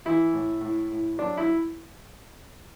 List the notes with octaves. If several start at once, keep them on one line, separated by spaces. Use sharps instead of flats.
E3 E4
A2
A2
A2
F#3 D4
E4